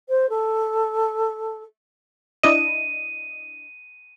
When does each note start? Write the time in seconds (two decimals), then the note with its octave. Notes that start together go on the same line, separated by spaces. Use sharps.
0.09 C5
0.29 A4
2.43 D4 E4 D#5 D#7